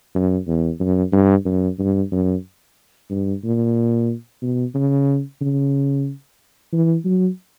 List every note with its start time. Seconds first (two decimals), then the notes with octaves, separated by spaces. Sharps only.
0.15 F#2
0.47 E2
0.80 F#2
1.13 G2
1.45 F#2
1.79 G2
2.12 F#2
3.11 G2
3.44 A#2
4.42 B2
4.75 C#3
5.41 C#3
6.73 E3
7.05 F#3